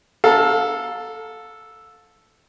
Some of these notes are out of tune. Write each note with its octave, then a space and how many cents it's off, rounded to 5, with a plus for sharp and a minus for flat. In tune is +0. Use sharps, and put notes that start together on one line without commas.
A4 +0 F5 +30 A#5 +0